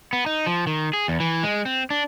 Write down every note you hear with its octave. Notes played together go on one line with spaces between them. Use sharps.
B3
D#4
F3
D#3
G#4
E2
E3
G#3
C4
D4